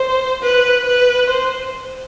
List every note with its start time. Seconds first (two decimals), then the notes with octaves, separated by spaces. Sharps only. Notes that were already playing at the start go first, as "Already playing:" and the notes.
Already playing: C5
0.43 B4
0.87 B4
1.30 C5